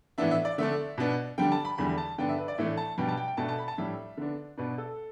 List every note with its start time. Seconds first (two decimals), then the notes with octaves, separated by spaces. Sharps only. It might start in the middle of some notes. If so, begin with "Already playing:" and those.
0.18 A2 E3 B3 D4 E5
0.31 E5
0.45 D5
0.58 D3 A3 D4 E5
0.98 B2 B3 D4
1.38 D3 G3 D4 G5
1.52 A5
1.65 B5
1.78 E2 D3 G3 B5
1.98 A5
2.18 G2 D3 B3 D4 G5
2.29 E5
2.38 B4
2.48 D5
2.58 A2 E3 A3 D4 E5
2.77 A5
2.98 B2 G3 B3 D4 G5
3.09 A5
3.17 G5
3.28 G5
3.37 B2 A3 D4 A5
3.49 A5
3.58 B5
3.68 A5
3.78 A2 G3 D4 E5
4.17 D3 B3 D4
4.58 B2 B3 D4 B4
4.78 A4